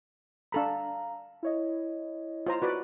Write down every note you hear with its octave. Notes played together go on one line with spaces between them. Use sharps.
D4 A4 F5 A#5 B5
E4 C#5 D#5
F4 C5 A#5
F#4 B4 D5